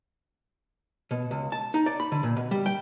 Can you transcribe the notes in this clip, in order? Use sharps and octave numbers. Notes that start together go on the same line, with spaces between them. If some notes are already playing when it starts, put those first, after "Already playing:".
B2
C#2
A5
D#4
D5
B5
D3
A#2
B2
G3
G5